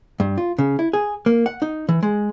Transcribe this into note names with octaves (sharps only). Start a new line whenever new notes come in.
G2
F4
C#3
E4
G#4
A#3
F#5
D#4
E3
G#3